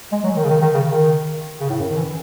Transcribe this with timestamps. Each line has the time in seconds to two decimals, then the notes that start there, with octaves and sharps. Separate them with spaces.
0.12 G#3
0.24 F#3
0.36 D#3
0.44 C#3
0.49 D#3
0.61 D#3
0.74 C#3
0.86 D#3
1.60 C#3
1.69 A2
1.79 F#2
1.89 D#3
1.97 E3